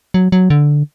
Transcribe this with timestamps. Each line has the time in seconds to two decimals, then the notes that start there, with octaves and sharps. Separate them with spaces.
0.14 F#3
0.32 F#3
0.50 D3